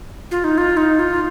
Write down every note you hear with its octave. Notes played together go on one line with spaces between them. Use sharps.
F4
D#4
F4
D#4
F4